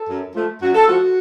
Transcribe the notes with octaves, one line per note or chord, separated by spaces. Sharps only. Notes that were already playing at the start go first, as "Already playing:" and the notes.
Already playing: A4
F#2
F3 A3
F#2 F#4
A4
F3 A3 F#4